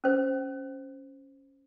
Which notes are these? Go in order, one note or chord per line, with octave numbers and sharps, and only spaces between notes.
C#4 C5